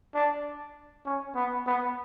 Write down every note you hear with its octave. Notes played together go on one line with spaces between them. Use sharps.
D4
C#4
B3
B3